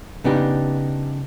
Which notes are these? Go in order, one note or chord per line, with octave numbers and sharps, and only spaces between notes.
C#3 B3 D4 D#4 G4